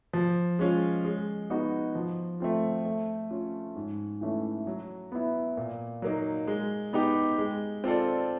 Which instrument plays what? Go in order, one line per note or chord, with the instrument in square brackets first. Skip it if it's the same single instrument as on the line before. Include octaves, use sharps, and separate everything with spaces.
[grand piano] F3
G#3 C#4 F4
G#3
B3 D#4 F#4
F3
A3 C4 F4
A3
C#4 F4
G#2
E3 A3 C#4
F#3
B3 E4
A#2
F#3 A#3 D#4
G#3
B3 D#4 G4
G#3
C4 F4 A4 D5